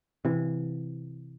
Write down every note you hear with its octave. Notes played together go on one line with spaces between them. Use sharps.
C3 E3